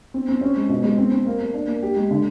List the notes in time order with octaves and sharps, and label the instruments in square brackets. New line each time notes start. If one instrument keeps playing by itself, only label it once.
[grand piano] C4
C4
C#4
G#3
B2
G#3
C4
C4
A#3
A#3
D4
A#3
G4
G#3
D3